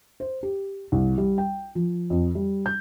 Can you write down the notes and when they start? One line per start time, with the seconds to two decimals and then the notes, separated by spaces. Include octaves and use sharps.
0.20 C5
0.43 G4
0.92 C2
1.18 G3
1.38 G5
1.75 F3
2.10 F2
2.35 G3
2.66 G6